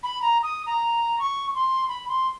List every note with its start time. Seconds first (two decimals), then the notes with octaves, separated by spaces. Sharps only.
0.03 B5
0.22 A#5
0.43 D#6
0.66 A#5
1.19 C#6
1.55 C6
1.89 B5
2.09 C6